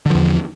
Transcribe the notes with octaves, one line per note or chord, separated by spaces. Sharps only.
E2 D3 F3